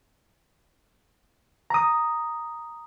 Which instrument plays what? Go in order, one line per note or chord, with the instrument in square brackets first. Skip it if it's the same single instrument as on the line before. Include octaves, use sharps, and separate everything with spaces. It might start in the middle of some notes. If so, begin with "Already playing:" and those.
[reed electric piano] A#5 D#6